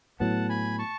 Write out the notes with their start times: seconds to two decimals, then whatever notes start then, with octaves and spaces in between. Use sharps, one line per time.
0.20 A2 F#3 B3 F#5 A5
0.49 G#5 B5
0.79 A5 C#6